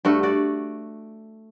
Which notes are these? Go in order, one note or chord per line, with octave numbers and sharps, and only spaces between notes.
G2 A3 F#4
F#4 D5